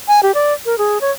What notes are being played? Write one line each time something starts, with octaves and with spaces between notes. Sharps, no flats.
G#5
G4
D5
A#4
G#4
C#5